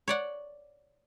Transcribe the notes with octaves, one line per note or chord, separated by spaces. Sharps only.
C#5 D5 F#5